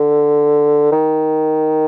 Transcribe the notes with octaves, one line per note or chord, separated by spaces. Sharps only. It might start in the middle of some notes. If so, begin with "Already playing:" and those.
Already playing: D3
D#3